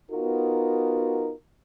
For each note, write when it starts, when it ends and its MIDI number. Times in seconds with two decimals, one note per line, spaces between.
0.11 1.32 59
0.11 1.32 63
0.11 1.32 65
0.11 1.32 66
0.11 1.32 70